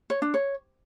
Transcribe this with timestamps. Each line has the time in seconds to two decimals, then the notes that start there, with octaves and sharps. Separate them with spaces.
0.10 C#5
0.22 D4
0.34 C#5